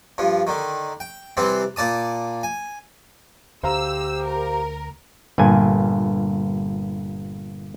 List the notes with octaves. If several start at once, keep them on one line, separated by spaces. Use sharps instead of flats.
G2 F3
D3 D#3
G5
C3 E3 G3 C4
A#2 D5 A5 D#6
G#5
D2 G4 C5 F5 A#5 E6
A#4
G1 G2 A#2 G#5